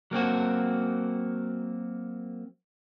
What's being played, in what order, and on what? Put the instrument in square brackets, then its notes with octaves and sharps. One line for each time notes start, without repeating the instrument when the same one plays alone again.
[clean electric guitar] F#3 A#3 C4 F#4